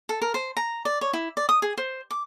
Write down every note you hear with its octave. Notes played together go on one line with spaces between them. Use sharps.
A4
A#4
C5
A#5
D5
C#5
E4
D5
D#6
G#4
C5
D6